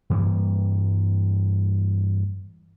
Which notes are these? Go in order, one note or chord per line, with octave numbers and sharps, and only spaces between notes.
G2 E3 G3 A#3